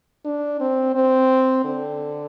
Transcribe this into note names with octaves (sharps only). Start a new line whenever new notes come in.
D4
C4
C4
D3